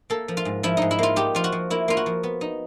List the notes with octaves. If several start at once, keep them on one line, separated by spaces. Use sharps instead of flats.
A#3 A4
F3
F4
G#2
F3 E4
G#2 D#4
E4
A#3 F4
D#4 G4
F3 F4
F#4
F3
A#3 E4
A#3 F4
F#4
F3
B3
D#4